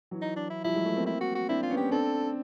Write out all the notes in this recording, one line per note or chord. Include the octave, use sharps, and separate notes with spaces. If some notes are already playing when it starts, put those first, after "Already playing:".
E3 F#3
D#4
D4
E4
F3 G3 E4
F#3 G#3
A3 B3
A#3 C4
E4
F#4
F#4
C4 D4 E4
F4
B3 C#4
G4
C4 D4 A4